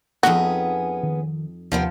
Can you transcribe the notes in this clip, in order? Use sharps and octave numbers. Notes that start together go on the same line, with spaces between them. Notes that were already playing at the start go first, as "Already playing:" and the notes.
F2 B3 C#4 D#4 F#4 G#4
D#3
D#2 C3 F3 B3 C4